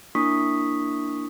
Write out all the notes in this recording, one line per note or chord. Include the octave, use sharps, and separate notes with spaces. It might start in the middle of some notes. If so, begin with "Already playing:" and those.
A#3 D4 E4 C#6 D#6 B6